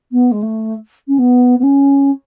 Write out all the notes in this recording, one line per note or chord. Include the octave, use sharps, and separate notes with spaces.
B3
G#3
A3
C#4
B3
B3
C#4